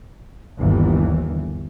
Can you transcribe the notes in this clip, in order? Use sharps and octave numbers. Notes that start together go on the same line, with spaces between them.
G1 D#2 E3